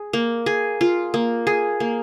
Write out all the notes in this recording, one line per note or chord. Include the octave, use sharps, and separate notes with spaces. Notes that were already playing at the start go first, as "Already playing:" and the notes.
Already playing: G#4
A#3
G#4
F4
A#3
G#4
A#3